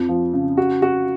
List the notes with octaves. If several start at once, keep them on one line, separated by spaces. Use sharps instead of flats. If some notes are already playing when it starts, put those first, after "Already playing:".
Already playing: F2
F3
C#3
F#4
F#4